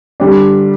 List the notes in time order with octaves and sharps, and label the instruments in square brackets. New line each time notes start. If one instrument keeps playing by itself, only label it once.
[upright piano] D3 G3 D4